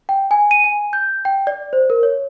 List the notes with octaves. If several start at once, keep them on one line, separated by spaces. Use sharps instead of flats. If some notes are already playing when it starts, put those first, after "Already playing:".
G5
G#5
D#7
G#5
G6
G5
D5
C5
A#4
C#5